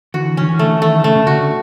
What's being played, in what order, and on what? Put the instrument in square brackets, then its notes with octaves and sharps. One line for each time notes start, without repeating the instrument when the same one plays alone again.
[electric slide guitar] D3 E3 [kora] F#4
[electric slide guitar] D#3 [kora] C#4
[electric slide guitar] D3 E3
[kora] A3
[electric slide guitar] D3
[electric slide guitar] D#3 [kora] A3
[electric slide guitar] C#3 [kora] A3
[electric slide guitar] C#3
[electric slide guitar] D3 [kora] F#4